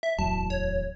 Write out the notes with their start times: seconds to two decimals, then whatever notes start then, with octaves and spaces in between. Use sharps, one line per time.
0.03 E5
0.19 D1 E2 F#3 A5
0.50 C#5